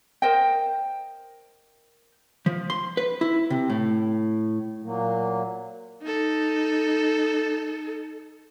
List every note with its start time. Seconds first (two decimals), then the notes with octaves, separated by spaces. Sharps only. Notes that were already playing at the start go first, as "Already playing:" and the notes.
0.22 A#4 C5 D#5 G5
2.46 F3
2.70 C6
2.97 B4
3.21 E4
3.50 C3
3.70 A2
4.83 A#2 F#3 A#3
6.02 D#4 A4